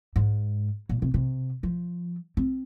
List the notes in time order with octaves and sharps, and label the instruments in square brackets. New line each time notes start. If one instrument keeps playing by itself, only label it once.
[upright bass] G#2
A#2
C3
C3
F3
C4